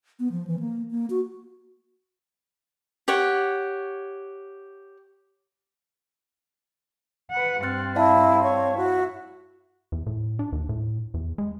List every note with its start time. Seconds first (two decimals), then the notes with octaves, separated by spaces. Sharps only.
0.19 B3
0.32 F3
0.47 E3
0.59 A#3
0.91 A#3
1.10 F#4
3.08 G4 C#5 F#5
7.31 B4 F#5
7.63 G2 C4 F6 F#6 A6
7.96 E4 D5 F5 A5
8.43 C#5
8.77 E4 F#4
9.92 E2
10.07 A2
10.39 D4
10.52 D#2
10.69 A2
11.14 E2
11.38 G#3